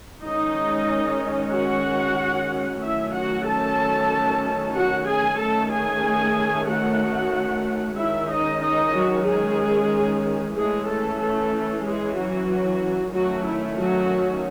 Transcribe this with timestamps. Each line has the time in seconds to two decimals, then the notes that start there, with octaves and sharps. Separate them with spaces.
0.23 D#3 G#3 C#4 D#4 D#5
1.52 F#4 F#5
2.81 D#3 F#3 A3 C#4 E4 E5
3.13 F#4 F#5
3.45 A4 A5
4.74 F#4 F#5
5.07 G#4 G#5
5.39 D#3 A3 C#4 A4 A5
5.71 G#4 G#5
6.68 F#4 F#5
7.97 D#3 G#3 C#4 E4 E5
8.29 D#4 D#5
8.61 D#4 D#5
8.93 F#3 F#4
9.26 G#3 G#4
10.55 E3 G#3 A3 C#4 G#4
10.87 A3 A4
11.19 A3 A4
11.84 G#3 G#4
12.16 F#3 F#4
13.12 D#3 F#3 A3 C#4 F#4
13.45 E4
13.77 F#3 F#4